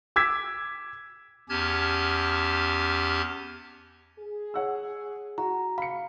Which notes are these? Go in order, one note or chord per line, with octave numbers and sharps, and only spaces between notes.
D6 E6 G#6 B6
E2 C#4 G4 A5 F6 G#6
G#4
C#5 F#5 E6
F#4 A#5
F5 B5 C#7